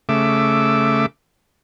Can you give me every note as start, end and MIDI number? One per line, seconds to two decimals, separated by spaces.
0.09 1.06 49
0.09 1.06 57
0.09 1.06 76
0.09 1.06 86